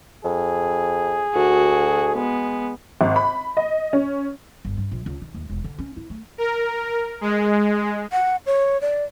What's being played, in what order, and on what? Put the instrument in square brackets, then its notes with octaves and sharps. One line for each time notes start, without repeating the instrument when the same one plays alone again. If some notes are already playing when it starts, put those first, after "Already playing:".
[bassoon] F2 [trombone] G#4
[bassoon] D2 [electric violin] F#4
[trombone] G#3 [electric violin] B3
[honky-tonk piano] G#1
B5
D#5
C#4
[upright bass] G1
G2
A#1
C#2
D#3
D#2
E1
D3
C#4
E4
A3
[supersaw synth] A#4
G#3
[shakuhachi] F#5
C#5
D5